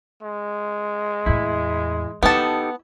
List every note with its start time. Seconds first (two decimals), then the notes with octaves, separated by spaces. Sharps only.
0.22 G#3
1.26 E2 A2 E4
2.23 B3 D#4 E4 G4 A4 A5